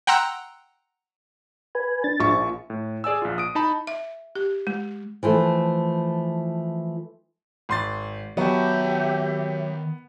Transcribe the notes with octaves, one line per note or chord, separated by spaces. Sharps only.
F#5 G5 A#5 C6 E6 F#6
B4 G#5
D4 A6
A#1 F3 C#6
A2
G#4 D5 G#5 E6
A#1 F4
D#6 D7
D#4 A5 B5
E5
G4
G#3
E3 F3 A3
G#1 C6 A6
D#3 F#3 B3 G4 E5 A5